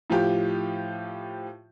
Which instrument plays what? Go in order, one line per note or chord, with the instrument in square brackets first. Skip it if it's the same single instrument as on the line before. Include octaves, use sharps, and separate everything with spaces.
[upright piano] A2 F3 F4 G4